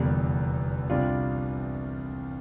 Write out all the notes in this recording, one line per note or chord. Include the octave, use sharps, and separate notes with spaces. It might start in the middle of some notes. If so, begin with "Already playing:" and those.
Already playing: F1 E2 D3 G3 A#3
C2 C3 G3 D4 F4